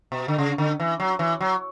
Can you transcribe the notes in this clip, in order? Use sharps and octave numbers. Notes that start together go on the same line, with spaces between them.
B2
D3
C#3
D3
E3
F#3
E3
F#3